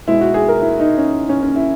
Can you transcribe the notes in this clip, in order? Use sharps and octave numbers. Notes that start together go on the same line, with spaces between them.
B2 G#3 E4
F#4
G#4
A#4
E4
D#4
C#4
C#4
C#4
E4